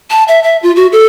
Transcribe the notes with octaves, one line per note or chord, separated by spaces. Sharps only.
A5
E5
E5
F4
F#4
A4